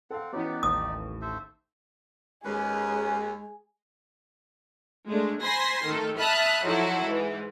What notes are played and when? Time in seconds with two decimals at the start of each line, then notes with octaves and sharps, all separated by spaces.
0.10 C4 A4 F5 F#5
0.33 E3 B3 C#4 D#4 F#4 G4 D5
0.63 A1 D#2 D#6
1.21 A4 C5 E5
2.45 D#2 G#3 C#4 G#4 B4
5.07 G#3 A3 D4
5.43 C5 G#5 B5 C6 A#6 C7
5.84 D#3 A3 A4
6.17 E5 A5 B5 D#6 F6 F#6
6.64 F3 F#3 D#4 E4 F#4 A4
7.05 G#2 E3